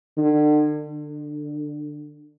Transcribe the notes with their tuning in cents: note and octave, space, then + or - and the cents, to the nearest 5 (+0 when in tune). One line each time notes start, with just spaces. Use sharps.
D3 +40
D3 +20